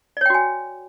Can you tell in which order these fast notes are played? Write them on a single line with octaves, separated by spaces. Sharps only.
D5 C#5 G5 F#4 G#5